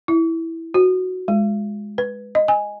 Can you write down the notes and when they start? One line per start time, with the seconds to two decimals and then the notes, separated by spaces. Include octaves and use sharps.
0.08 E4
0.74 F#4
1.28 G#3
1.98 B4
2.35 D#5
2.48 G#5